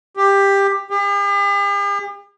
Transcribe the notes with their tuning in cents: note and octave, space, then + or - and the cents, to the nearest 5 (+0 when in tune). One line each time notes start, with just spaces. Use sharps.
G4 +15
G4 +45